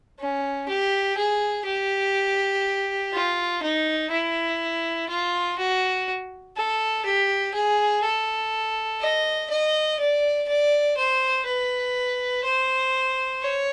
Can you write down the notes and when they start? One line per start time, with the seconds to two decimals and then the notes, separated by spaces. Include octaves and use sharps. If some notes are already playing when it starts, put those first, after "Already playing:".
0.19 C#4
0.68 G4
1.17 G#4
1.66 G4
3.13 F4
3.62 D#4
4.11 E4
5.09 F4
5.58 F#4
6.56 A4
7.05 G4
7.54 G#4
8.03 A4
9.01 D#5
9.50 D#5
9.99 D5
10.48 D5
10.97 C5
11.46 B4
12.44 C5
13.42 C#5